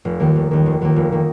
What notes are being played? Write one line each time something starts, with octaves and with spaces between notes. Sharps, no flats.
F1
D#2 D#3 A#3
F1
D#2 D#3 A#3
F1
D#2 D#3 A#3
F1
D#3 A#3